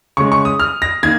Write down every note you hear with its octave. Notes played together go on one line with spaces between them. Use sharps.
C#3 G#3 C#6
C#6
D#6
F6
A#6
D#3 A#3 G#6